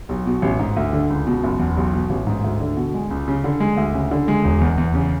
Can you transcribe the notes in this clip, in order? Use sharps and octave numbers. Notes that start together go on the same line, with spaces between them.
B1
B2
A1
G#2
D2
D3
C#2
B2
F#1
E2
B1
B2
A1
G#2
D2
D3
B2
G#3
C#2
C#3
D3
G#3
D2
C#3
D3
G#3
E1
E2
E2
C#3